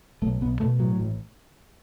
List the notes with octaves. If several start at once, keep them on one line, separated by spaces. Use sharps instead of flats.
B1 A3
B1 B3
B2 A3
A2 F#3
A1